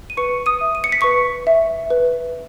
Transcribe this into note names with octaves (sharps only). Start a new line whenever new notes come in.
D#7
B4 C#6 C#7
D#6 D#7
E5
D#7
C#7
B6
B4 C#6 C#7
E5
B4